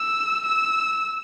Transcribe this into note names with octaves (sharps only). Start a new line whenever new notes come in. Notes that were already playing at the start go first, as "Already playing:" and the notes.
Already playing: E6
E6